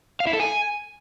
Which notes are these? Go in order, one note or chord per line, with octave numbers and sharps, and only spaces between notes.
F5
E4
A4
G#5